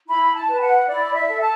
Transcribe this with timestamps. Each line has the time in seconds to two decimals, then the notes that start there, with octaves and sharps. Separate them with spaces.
0.08 E4 B5
0.35 A5
0.48 B4
0.61 F#5
0.87 E4 D5
1.14 E5
1.27 A4
1.40 A5